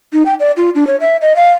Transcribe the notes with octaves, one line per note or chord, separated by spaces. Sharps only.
D#4
G5
D5
F4
D4
C#5
E5
D#5
F5